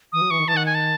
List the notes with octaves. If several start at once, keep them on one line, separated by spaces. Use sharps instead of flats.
E3 D#6
F#3
E3 C#6
D#3
E3 A5
D#3 F#5
G#5
A5